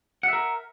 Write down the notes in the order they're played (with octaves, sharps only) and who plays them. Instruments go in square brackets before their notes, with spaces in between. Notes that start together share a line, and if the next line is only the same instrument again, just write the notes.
[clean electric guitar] F#5
E5
A#4